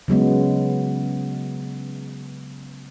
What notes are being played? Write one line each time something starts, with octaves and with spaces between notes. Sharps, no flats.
C#3 F#3 G#3 B3